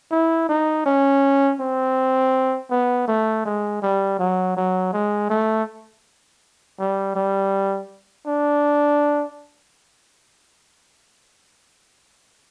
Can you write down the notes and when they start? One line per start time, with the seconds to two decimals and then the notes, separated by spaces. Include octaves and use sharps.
0.11 E4
0.49 D#4
0.86 C#4
1.60 C4
2.71 B3
3.08 A3
3.45 G#3
3.82 G3
4.19 F#3
4.57 F#3
4.93 G#3
5.30 A3
6.79 G3
7.15 G3
8.26 D4